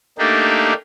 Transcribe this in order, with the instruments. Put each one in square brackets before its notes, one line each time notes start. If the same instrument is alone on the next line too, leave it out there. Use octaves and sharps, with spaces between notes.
[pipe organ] A3 A#3 D4 D#4 G4